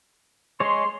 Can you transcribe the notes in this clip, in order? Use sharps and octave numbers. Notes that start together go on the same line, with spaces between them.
G#3 C#5 C6